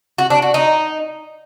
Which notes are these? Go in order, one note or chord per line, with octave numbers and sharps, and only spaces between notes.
F#4
D4
F#4
D#4